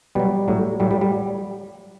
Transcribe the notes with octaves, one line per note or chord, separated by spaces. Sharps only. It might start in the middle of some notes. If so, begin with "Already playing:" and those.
B2 F#3 G3
A2 F#3
A2 F#3 G3
G3
G3